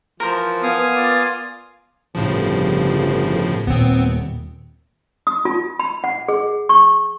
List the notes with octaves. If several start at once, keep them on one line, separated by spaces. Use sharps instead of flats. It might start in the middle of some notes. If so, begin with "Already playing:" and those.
E3 F3 A#4 C5
B3 F5 G#5 D#6
A#3 F4 D5
G1 A2 C#3 F3
D#2 A#2 B3 C4
D#6
F4
B5
F#5
G#4
C#6